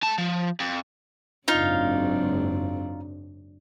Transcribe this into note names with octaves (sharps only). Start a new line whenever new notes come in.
A3 A5
F3
F2
F#1 G#2 F#3 C4 D4 D#4 F4 F5